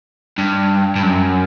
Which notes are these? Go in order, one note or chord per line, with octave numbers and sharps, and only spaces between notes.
G2
G2
F#2